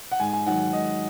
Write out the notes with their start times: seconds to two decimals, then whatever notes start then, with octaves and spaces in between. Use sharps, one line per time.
0.12 F#5
0.20 G#2 G#5
0.33 G#5
0.46 D#3 F#3 F#5
0.73 G#2 D#5